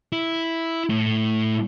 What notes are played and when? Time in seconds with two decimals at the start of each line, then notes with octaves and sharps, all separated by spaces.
0.12 E4
0.89 A2